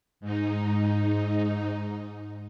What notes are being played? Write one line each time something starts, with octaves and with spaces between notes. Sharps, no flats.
G#2 D#4